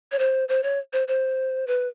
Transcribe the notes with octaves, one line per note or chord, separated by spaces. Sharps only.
C#5
C5
C5
C#5
C5
C5
B4